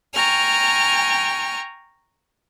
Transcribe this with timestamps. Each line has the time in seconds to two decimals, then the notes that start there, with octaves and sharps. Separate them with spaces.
0.13 G5 G#5 A#5 C#6 F6